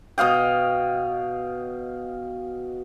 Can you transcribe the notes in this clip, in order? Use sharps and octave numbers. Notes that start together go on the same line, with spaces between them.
B2 D#5 F5 G5